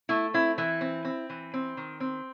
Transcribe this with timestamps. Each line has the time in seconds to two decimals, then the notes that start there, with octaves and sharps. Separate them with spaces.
0.09 A3 E4
0.34 C4 E4
0.58 E3 E4
0.81 C4
1.05 C4
1.30 E3
1.54 C4
1.77 D#3
2.00 C4